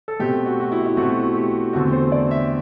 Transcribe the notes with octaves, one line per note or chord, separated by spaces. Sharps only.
A4
B2 A3 C4 G4
F#4
F#4
E4
E4
B2 A3 C4 F#4
G4
E2 D3 A3 C4 F#4
C5
D5
E5